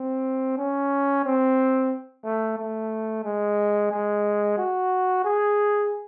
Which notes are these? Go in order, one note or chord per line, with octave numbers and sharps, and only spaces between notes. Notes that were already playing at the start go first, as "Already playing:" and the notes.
Already playing: C4
C#4
C4
A3
A3
G#3
G#3
F#4
G#4